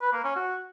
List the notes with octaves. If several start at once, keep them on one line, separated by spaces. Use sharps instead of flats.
B4
A#3
C#4
F#4